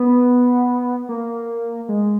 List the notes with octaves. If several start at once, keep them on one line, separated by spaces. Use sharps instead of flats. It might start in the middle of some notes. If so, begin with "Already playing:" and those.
Already playing: B3
A#3
G#3